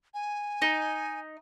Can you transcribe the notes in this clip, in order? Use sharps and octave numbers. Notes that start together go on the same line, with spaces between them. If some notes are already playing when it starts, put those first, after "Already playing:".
G#5
D#4